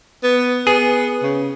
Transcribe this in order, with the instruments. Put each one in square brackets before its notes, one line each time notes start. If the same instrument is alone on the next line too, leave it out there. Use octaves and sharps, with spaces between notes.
[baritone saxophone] B3
[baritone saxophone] B3 [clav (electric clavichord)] G#4
[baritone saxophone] C#3